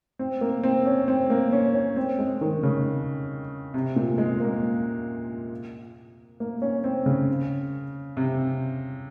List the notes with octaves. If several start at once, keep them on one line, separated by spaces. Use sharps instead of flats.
C4
A#3
C4
C#4
C4
A#3
C#4
C#4
C4
G#3
D#3
C#3
C3
A#2
G#3
A#3
A#3
C#4
C4
C#3
C3